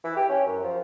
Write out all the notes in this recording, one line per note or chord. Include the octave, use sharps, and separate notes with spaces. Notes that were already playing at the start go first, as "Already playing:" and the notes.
E3
G4
C#4
F#2
F3